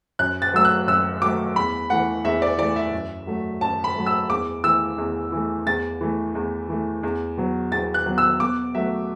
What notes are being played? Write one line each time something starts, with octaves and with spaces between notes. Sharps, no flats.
F#2 F#6
A6
F#3 A3 E6
F#6
F#2 E6
F#3 A3 D6
E2 B5
E3 A3 F#5
E2 E5
D5
E3 A3 D5
E5
F#2
F#3 A3
F#2 A5
B5
F#3 A3
E6
E2 D6
E3 A3 E6
E2
E3 A3
E2 A6
E3 A3
E2
E3 A3
E2
B2 F#3
E2 A6
F#6
B2 F#3
E6
B2 D6
F#3 A3 E5